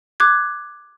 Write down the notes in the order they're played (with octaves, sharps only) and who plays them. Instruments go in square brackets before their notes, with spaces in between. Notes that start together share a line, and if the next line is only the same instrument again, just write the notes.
[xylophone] D6 F#6 G#6